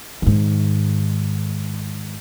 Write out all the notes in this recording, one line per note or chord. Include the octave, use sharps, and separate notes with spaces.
G#2 D#3